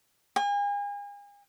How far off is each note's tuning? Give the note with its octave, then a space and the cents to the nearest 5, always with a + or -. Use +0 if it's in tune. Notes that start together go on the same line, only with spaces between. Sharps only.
G#5 -40